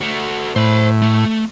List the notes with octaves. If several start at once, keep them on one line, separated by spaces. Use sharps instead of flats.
A3 F#4
A2 C5 B5
A3